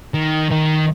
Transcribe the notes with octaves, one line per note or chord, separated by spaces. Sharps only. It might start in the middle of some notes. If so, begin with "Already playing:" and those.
D#3
D#3